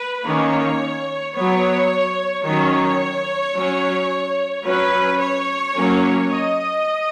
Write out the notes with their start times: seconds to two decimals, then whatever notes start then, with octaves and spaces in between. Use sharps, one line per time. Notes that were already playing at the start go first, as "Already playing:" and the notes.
Already playing: B4
0.25 D#3 A#3 C#4 C#5
1.35 F#3 B3 C#5
2.45 D#3 F#3 C#4 C#5
3.54 F#3 C#4
4.64 F#3 C#4 B4
5.19 C#5
5.75 F#3 A#3 C#4
6.30 D#5